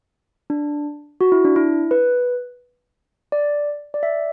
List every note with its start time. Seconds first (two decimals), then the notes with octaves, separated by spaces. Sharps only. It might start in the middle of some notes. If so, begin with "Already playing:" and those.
0.50 D4
1.21 F#4
1.32 E4
1.44 D4
1.56 E4
1.91 B4
3.32 D5
3.94 D5
4.03 E5